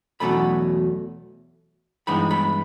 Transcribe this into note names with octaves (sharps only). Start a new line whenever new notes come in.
E2 B2 F#3 A3 C#4 B5
G2 E3 G#3 B3 D#4 B5
B5